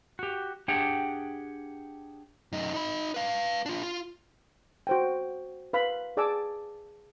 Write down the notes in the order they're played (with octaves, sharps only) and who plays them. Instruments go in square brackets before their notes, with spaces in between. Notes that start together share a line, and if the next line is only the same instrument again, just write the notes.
[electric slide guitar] F#4 G4
D4 G4 G#4 F#5 G5
[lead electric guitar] F#2 D#4
D#4 B5
B4 F5
D4 F4
F4
[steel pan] F#4 C5 G5
B4 F5 B5
G#4 D5 G#5 A5 D6 E6